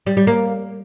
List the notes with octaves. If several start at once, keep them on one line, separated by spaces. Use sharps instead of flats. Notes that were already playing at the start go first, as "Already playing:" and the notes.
G3
G3
A#3